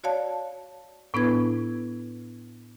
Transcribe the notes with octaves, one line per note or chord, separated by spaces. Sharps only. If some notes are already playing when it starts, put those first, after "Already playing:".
F#4 C#5 D5 F5 A5
A2 B3 D4 E4 B4 G#6